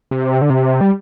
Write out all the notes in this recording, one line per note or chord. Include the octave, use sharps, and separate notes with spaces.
C3
D3
C3
G3